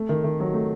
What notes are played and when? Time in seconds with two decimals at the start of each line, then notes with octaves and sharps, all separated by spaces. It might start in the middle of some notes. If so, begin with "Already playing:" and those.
Already playing: A3
0.09 D#3
0.24 D#3
0.40 F#3
0.54 A3